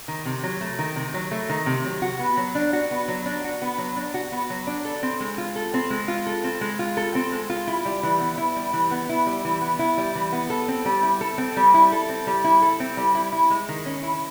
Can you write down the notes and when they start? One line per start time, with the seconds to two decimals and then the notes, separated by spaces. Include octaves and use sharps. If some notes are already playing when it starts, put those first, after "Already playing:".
0.08 D#3
0.25 C3
0.43 F#3
0.61 A3
0.79 D#3
0.96 C3
1.14 F#3
1.31 A3
1.49 D#3
1.66 C3
1.85 F#3
2.02 F#4
2.19 B3
2.37 F#3
2.55 D4
2.73 F#4
2.91 B3
3.08 F#3
3.26 D4
3.44 F#4
3.62 B3
3.78 F#3
3.96 D4
4.14 F#4
4.32 B3
4.50 F#3
4.67 D4
4.85 A4
5.03 C4
5.20 G#3
5.38 F4
5.56 A4
5.74 C4
5.90 G#3
6.08 F4
6.26 A4
6.44 C4
6.61 G#3
6.79 F4
6.97 A4
7.15 C4
7.32 G#3
7.50 F4
7.67 E4
7.85 G3
8.03 E3
8.20 B3
8.38 E4
8.56 G3
8.73 E3
8.91 B3
9.09 E4
9.26 G3
9.45 E3
9.61 B3
9.79 E4
9.97 G3
10.15 E3
10.32 B3
10.50 A4
10.68 C4
10.85 G3
11.03 E4
11.21 A4
11.38 C4
11.56 G3
11.74 E4
11.92 A4
12.09 C4
12.27 G3
12.44 E4
12.62 A4
12.80 C4
12.97 G3
13.15 E4
13.32 E4
13.50 G#3
13.69 D#3
13.86 C#4
14.03 E4